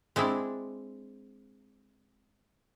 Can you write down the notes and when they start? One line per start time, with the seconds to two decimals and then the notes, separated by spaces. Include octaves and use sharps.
0.16 G#3 C4 D4 E4